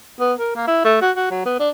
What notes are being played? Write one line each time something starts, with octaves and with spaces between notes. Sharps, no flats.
B3
A#4
A#3
E4
A3
F#4
F#4
F#3
B3
D4